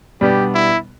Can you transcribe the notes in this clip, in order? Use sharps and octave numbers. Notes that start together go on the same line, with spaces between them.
B2 G3 B3 D4 G4
E4